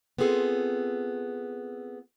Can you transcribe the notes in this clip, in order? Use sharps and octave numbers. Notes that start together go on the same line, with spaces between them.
B3 C4 F4 G#4 A4